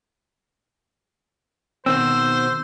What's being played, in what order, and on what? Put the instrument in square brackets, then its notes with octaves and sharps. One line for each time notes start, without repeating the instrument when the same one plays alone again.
[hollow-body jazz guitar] B2 D#3 C4 [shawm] C5 [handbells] E6